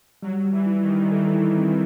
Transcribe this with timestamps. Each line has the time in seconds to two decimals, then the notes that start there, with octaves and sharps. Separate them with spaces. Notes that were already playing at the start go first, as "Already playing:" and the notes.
0.23 F#3 G3
0.44 G3
0.52 E3
0.66 E4
0.82 D#3
0.89 G3
1.12 E3 A4
1.34 E4
1.56 C4